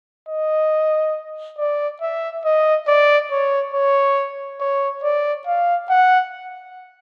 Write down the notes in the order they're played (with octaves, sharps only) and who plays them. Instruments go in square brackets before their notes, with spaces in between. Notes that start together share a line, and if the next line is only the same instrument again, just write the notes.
[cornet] D#5
D5
E5
D#5
D5
C#5
C#5
C#5
D5
F5
F#5